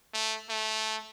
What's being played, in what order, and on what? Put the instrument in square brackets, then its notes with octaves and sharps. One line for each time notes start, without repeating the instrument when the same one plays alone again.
[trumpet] A3
A3